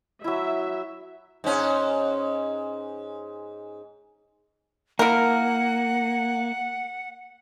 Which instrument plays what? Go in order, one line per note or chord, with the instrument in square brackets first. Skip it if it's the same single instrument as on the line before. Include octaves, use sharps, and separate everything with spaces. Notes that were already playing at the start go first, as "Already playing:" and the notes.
[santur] F#3 E4 [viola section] E5
[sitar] G#2 C#4
[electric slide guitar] A#3 [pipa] E4 A#4 [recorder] F#5